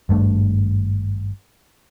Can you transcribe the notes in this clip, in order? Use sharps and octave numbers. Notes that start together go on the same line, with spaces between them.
G#1 G2 A3 D4